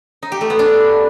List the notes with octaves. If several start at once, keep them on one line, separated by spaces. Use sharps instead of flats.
D#4
G4
A3
B3
D4